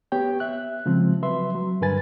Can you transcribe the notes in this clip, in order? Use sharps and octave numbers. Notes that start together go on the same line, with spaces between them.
B3 G4 C#5 G5
E5 F#6
C#3 F3 G#3 C4
F#3 B4 E5 C6
F#3
G2 D3 A#4 B4 G#5 A6